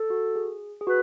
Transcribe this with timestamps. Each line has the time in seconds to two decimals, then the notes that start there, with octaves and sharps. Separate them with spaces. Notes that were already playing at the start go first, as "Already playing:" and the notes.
Already playing: A4
0.10 F#4
0.36 G#4
0.81 G#4
0.87 F#4 B4